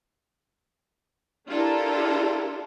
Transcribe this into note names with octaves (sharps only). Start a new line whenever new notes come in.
D4 E4 F4 G4 A4 A#4